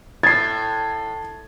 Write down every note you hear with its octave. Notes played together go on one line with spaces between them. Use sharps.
A2 G#6 A6 C7